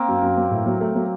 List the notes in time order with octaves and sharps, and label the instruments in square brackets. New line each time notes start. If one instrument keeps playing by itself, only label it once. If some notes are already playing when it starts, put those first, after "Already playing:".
Already playing: [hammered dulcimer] A#3 C4
[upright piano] F#2
F#2
F#3
A2
F#3
A3
F#3